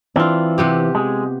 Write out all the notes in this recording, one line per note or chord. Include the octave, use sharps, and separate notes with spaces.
E3 C4 D4 F4
C3 B3 G4
G#3